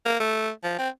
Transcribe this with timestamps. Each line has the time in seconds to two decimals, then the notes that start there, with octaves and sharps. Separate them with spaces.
0.05 A#3
0.20 A3
0.64 F3
0.78 C4